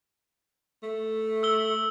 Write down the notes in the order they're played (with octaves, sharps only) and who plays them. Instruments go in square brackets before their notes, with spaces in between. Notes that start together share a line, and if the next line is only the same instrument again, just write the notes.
[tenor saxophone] A3
[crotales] E6 G7